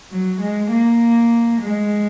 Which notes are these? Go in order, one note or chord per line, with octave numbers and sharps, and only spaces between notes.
F#3
G#3
A#3
G#3